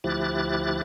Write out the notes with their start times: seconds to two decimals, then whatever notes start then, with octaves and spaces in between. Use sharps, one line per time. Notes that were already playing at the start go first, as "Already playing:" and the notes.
0.04 D2 F3 E4 G4 F#6 A6